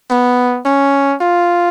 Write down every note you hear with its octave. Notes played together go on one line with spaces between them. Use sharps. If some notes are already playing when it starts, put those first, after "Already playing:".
B3
C#4
F4